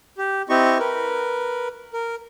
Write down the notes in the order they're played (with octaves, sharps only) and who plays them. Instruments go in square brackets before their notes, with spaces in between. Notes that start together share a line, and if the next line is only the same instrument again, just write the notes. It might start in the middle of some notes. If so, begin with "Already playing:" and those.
[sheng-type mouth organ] G4
C4 E4 G4 D#5 C#6
A#4 B4
A#4